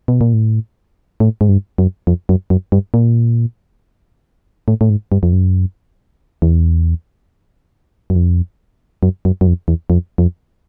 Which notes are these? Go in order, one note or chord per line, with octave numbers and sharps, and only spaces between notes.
B2
A#2
A2
A2
G#2
G2
F#2
F2
F#2
F#2
G2
A#2
A2
A2
G#2
G2
F2
F#2
E2
F#2
F2
F#2
F#2
F#2
F2
E2
F2
F2